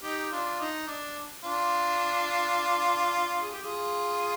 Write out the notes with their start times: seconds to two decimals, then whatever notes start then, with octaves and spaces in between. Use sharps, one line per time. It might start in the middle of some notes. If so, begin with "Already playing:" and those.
0.02 D#4 G4
0.31 D4 F4
0.59 D#4
0.87 D4
1.44 D4 F4
3.41 G#4
3.52 G4
3.62 F4 G#4